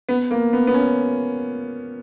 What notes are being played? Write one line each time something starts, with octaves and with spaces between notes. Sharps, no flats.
B3
A#3
B3
B3
C#4